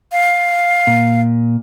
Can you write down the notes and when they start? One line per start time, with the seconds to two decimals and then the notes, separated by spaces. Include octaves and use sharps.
0.12 F5
0.87 A#2